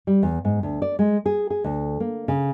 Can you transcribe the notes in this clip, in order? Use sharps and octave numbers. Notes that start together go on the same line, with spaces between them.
G3
E2
G#2
D2
D5
G#3
G#4
G#4
D2
A#3
C#3